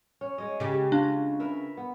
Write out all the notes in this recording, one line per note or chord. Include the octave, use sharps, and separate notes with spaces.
C#4
G#3 C#5 D#5
C#3 G4
D4 F4
A#4 B4 E5
B3